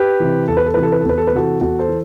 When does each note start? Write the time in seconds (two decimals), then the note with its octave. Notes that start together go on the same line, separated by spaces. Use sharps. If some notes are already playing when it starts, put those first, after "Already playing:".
Already playing: G4 B4
0.20 C3 E3
0.48 E2 A4
0.57 B4
0.66 A4
0.74 C3 E3 B4
0.83 A4
0.92 B4
1.01 A4
1.05 E2 B4
1.18 A4
1.27 B4
1.33 C3 E3 F#4 A4
1.60 E2 F#4 A4
1.79 A4 C5
1.89 E3